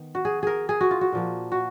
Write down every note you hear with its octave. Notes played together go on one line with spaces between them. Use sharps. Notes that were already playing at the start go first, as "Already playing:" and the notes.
Already playing: D#3 B3
F#4
G#4
G#4 A#4
G#4
F#4
F4
F#4
A#2 F3 A#3
F#4